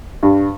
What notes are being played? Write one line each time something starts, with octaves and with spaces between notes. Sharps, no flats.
G2